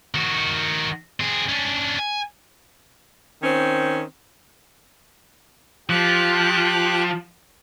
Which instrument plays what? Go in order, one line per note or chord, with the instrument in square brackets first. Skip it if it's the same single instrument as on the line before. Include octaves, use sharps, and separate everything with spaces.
[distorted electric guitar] D#3 F#4
C4 G#4
C#4 D4
G#5
[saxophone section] D#3 C4 C#4
[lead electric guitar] F3 [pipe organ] G4 F#6